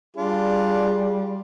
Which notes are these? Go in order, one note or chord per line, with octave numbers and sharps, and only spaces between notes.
G3 D4 F4 G#4